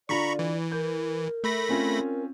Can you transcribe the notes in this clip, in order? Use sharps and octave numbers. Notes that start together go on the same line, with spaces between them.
D3 F4 D5 A#5 B5 C#6
E3
A#4 G6
A3 B5 A#6
C4 C#4 F4